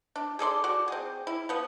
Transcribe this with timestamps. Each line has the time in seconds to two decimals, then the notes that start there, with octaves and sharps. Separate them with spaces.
0.16 D4
0.39 G#4 A4 D5 C6
0.64 F#4 D5
0.88 C4 G#4
1.27 E4
1.49 F3 B3